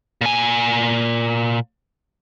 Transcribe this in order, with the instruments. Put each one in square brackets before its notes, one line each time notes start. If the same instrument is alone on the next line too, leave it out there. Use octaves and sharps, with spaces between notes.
[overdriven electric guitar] A#2 G#5